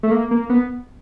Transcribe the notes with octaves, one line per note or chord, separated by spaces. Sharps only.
A3
A#3
A#3
B3